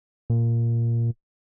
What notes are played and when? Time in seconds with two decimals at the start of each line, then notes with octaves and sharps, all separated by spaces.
0.30 A#2